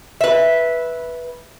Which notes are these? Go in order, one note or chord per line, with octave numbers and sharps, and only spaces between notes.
B4 E5